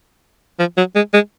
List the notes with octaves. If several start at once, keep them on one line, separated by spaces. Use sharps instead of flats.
F3
F#3
G#3
G#3